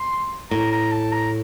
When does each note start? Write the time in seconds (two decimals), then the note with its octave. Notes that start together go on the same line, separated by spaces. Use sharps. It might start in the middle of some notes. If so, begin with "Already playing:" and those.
Already playing: C6
0.51 A2 A#5
0.72 A#5
0.92 A5
1.12 A#5